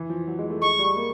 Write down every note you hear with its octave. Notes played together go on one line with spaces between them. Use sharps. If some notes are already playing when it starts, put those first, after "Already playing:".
Already playing: E3
F3
F#3
G#3
A3
G#3 C#6
G3
A#3